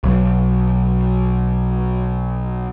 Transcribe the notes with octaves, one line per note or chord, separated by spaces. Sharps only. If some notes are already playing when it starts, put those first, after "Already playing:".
B1 F#3